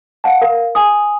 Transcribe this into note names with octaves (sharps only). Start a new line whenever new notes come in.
F5 F#5 A5
A#4 F5
G#5 D#6